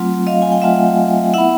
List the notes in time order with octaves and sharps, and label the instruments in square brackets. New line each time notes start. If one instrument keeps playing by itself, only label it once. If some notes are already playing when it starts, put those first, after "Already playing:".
Already playing: [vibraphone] F#3 A3 C4 F4
D#5 F5
G#5
G5
F#3 A3 C4 F4 E5 F#5
B3 E4 E5 F#5